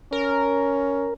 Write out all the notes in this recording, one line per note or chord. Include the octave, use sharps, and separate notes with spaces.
C#4 A#4